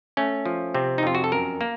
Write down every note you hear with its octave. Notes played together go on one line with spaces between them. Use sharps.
A3 C#4
F3
C3 C4
D#4
F2 F4
F#4
A4
F#2 A#4
A#3